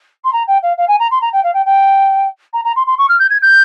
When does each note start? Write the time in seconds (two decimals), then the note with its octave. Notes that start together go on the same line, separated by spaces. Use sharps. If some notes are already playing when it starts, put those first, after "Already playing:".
0.24 C6
0.32 A#5
0.47 G5
0.62 F5
0.77 F5
0.88 G#5
0.99 A#5
1.11 C6
1.21 A#5
1.33 G5
1.43 F5
1.54 G5
1.65 G5
2.53 A#5
2.64 A#5
2.76 C6
2.86 C6
2.98 C#6
3.09 F6
3.19 G6
3.30 G#6
3.42 G6